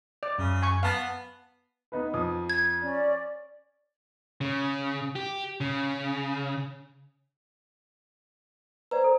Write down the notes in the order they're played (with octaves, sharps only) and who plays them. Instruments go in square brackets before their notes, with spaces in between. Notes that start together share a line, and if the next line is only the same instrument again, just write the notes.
[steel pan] D5
[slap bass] F#2 [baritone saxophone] C#3
[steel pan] G#5 C#6
[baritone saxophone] B3 [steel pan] F5 A5
[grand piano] B3 D#4 B4
F2 D#6
[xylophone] G#6
[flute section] C#4 D5
[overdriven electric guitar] C#3
G4
C#3
[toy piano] B4 D5 [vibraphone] C5 A#5
[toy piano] A4